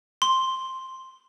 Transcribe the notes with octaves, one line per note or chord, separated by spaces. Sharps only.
C6